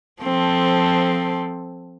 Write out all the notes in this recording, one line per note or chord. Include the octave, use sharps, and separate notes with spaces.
F3 C4 A4